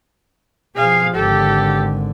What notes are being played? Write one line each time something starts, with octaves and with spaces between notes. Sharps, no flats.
B2 F3 G#4 F5
G#1 D3 G4 A4